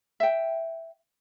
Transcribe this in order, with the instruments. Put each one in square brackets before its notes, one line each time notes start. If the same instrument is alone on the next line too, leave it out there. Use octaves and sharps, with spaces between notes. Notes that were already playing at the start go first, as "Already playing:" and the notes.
[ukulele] E5 G5